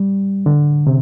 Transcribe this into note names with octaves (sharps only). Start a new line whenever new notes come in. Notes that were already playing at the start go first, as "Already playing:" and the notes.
Already playing: G3
D3
C3